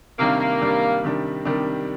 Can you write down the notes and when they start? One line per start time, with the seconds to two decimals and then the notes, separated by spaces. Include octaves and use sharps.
0.19 C3 D#3 G3 A#3 D4
0.40 A#3
0.61 C3 D#3 G3 D4
1.04 C3 D#3 G3 D4
1.45 C3 D#3 G3 D4